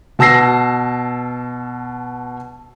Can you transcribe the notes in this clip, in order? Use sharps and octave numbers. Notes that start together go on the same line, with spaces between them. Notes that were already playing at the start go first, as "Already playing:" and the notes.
B2 A5 E6 A#6 C7